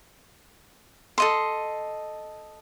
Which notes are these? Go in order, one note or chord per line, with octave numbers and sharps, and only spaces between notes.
A4 D#5 C6